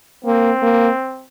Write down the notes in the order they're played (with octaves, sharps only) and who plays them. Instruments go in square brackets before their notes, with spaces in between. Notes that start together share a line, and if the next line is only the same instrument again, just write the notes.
[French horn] A#3 [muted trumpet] C4
[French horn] A#3